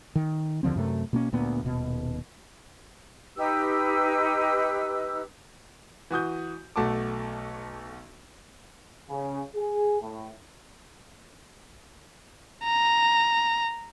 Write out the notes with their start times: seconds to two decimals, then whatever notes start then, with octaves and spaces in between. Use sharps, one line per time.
0.15 D#3
0.63 D#2 D3 F3 C4
0.76 F#2 C3 A3
1.13 B2 A#3 C#4
1.33 D2 A#2 B3
1.63 D#1 B2
3.36 D#4 G4 B4 E6
6.11 E3 F#4 D#6 G6
6.76 B1 A3 F#4 A5 D6
9.09 C#3
9.55 G#4
10.01 A2
12.64 A#5